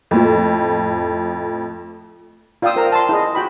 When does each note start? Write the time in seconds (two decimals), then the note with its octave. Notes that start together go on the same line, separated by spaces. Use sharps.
0.11 F2 A2 F3
2.62 F4 D5 F5 G5 D#6 E6
2.76 A#4 C5 A#5
2.92 A5 C6
3.09 E4 G#4 D#5
3.35 F#4 G5 B5